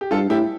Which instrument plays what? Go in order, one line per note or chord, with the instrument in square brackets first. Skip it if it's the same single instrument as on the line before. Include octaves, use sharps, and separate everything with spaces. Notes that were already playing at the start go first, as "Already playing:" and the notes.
[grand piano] G4
[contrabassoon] G2 [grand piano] F4 A4
[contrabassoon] A2 [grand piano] E4 G4